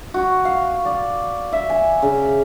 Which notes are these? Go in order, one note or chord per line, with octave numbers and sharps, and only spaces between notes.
F#4
F5
D5
E5
G#5
C#3